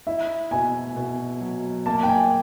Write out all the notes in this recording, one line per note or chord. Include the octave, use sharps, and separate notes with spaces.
E4 E5
B2 G#5
B2
F#3
A#3 A5
G5
G#5